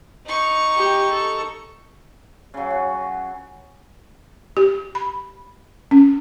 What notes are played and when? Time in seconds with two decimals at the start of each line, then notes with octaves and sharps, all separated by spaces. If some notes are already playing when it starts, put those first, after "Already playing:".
0.26 D#4 C#6
0.76 G4
1.12 A4
2.54 C#3 F#3
2.70 F#4
4.57 G4
4.95 B5
5.91 C#4